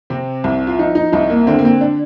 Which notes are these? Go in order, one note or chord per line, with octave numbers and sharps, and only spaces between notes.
C3 C4
C2
F4
F3 D#4
D#4
C2 D#4
A#3
D3 C4
A#3
C4
D4